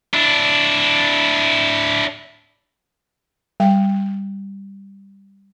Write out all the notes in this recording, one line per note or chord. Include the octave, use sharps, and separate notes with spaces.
D4 E4
G3 G5